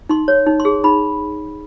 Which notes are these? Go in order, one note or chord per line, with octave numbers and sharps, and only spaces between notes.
D#4 C6
C#5
D#4
C6
G#4
D#4 B5